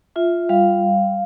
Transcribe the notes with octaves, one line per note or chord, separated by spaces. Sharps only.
F4 E5
G3 F5